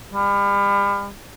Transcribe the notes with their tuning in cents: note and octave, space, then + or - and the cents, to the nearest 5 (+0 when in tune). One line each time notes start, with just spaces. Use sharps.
G3 +40